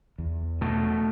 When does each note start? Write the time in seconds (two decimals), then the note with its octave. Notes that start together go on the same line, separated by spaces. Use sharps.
0.18 E2
0.61 B2 A3